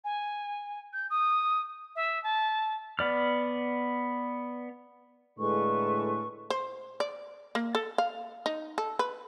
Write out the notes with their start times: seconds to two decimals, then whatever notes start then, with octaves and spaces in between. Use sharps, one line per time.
0.04 G#5
0.93 G6
1.10 D#6
1.96 E5
2.23 A5
2.99 B3 D5 F6
5.39 A2 D3 G#3 A4 B4 C#6
6.50 C5
7.00 D5
7.55 A#3
7.75 A4
7.98 F5
8.46 D#4
8.78 A4
8.99 B4